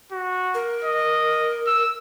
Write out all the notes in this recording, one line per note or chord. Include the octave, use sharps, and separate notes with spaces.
F#4
A#4
D#5
E6